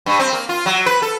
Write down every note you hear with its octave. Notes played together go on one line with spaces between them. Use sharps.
G2
C4
A#3
F4
F#3
B4
A4